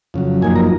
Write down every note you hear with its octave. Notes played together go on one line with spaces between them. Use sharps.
F2 C#3 F#3
F#2 F3 A#3 D#4 G#5
A#5